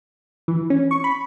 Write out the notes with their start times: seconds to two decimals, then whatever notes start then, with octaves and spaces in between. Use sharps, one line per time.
0.48 E3
0.70 C#4
0.91 C#6
1.04 B5